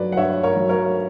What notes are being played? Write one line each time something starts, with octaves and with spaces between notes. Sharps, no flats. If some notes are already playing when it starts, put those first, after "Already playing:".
Already playing: G2 F#3 B4 D5
F#5
G2 C#5 E5
A#4 C#5
F#3
A#4 C#5